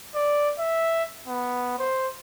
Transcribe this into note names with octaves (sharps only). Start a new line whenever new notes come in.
D5
E5
B3
C5